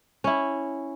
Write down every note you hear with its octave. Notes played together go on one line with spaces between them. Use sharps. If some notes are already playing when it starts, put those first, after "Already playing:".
C#4 E4